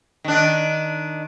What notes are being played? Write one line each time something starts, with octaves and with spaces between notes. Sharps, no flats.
D#3 D4